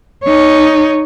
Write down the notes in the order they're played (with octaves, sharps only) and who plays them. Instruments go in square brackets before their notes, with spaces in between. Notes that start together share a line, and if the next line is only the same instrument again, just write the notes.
[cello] D#4 C#5